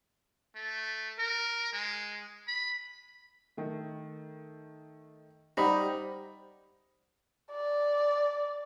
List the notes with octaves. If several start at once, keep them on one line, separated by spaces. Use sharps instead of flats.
A3
A#4
G#3
B5
D#3 A3
G3 D#4 G4 C5 F#5 B5
D5